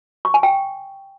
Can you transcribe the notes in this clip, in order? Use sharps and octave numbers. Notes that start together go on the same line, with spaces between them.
C#6
G#5
G5